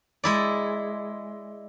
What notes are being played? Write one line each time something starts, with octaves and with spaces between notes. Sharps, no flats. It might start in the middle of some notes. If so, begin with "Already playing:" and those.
G#3 E4 D5